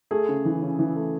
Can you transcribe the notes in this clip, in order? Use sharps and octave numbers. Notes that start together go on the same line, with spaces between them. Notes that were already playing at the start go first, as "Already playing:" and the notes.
A3 G#4
C#3
E3
C#3
E3
A3